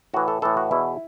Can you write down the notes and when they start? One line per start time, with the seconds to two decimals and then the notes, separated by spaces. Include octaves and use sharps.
0.14 A2 E3 F#4
0.28 A4
0.42 A2 E3 A4
0.57 F#4
0.71 E2 B2 E4